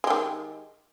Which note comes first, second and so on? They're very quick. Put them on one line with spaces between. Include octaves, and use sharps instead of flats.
G#3 G4 D#3